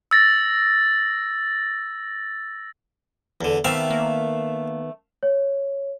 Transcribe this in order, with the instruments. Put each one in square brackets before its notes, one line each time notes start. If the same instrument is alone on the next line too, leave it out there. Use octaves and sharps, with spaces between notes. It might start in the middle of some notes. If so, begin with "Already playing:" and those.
[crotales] E6 A6 A#6
[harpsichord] E2 D3
[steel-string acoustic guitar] D#3 B3 [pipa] G3 A3 C4 [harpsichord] E5 F5
[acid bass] A#3
[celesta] C#5